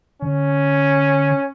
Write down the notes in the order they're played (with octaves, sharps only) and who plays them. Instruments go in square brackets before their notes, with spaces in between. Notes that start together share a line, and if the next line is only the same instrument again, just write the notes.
[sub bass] D3 [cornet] C#4